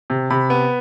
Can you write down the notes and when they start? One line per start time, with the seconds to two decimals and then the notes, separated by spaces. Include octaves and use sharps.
0.10 C3
0.30 C3 B5
0.50 B3